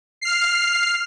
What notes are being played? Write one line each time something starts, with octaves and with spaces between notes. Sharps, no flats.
F6 C7